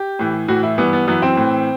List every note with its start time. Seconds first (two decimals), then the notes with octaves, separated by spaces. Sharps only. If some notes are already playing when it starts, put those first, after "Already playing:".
Already playing: G4
0.19 A2 E3
0.48 A2 E3 F#4
0.63 E4
0.78 G2 E3 B3
0.93 B3
1.08 F#2 E3 B3
1.22 C4
1.37 A2 E3